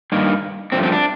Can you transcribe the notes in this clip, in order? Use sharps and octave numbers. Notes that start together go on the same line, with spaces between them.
G2 D#3 A#3
G2 F3 A3 C4
C4
D4